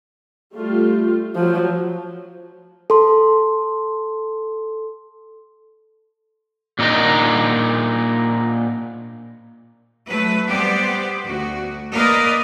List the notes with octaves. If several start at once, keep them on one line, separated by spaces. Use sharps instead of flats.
G3 A3 F4
F3 F#3 F4
A4 C6
A#2 D4 D#4 A#4 D#5
F#3 A3 B4
G3 B3 G4 C5 D5
D2 F#4
A#3 A#4 B4 D5 D#5